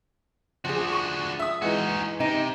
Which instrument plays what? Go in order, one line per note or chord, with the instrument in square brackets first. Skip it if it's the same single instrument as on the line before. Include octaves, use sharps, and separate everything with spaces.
[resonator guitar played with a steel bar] F3 G#4 [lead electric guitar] D4 F#4
[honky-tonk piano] C#6 D#7 E7
E5 D#6
[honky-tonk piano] E3 G#3 [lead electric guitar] D#4 F#4
[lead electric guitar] C3 [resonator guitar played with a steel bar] D#4